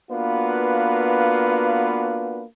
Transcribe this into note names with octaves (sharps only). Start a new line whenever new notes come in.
A#3 B3 D4 F4 F#4 B4